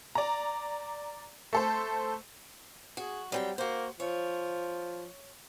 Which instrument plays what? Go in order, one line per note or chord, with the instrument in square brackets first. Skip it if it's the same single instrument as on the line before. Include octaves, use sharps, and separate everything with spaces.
[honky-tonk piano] D5 A#5
A3 A4 C5
[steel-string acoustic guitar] F#4 [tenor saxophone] G#4
[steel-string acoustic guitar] F#3 C4 G5 [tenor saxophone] G3
[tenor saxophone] A#3 [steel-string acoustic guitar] F#4 C5
[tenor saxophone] F3 [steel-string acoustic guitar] C#5